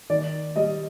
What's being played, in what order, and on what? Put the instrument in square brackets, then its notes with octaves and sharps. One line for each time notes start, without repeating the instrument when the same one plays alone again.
[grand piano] D#3 D5
G3 D#5